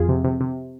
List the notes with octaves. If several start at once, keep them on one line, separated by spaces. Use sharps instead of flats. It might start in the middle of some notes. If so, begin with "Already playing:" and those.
Already playing: F2 F4 G#4
C3
C3
C3